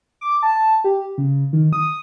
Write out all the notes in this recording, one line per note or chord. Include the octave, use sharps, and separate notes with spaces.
D6
A5
G4
C#3
D#3
D#6